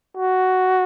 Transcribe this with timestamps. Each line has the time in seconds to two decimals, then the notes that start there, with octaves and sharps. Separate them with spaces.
0.17 F#4